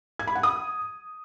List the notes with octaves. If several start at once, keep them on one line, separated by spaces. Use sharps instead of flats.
G#6
B5
F#5
D#6